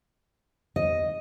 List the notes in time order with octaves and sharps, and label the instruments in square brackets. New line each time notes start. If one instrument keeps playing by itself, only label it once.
[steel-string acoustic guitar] D#5